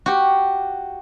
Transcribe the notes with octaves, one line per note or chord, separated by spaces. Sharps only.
F#4 G4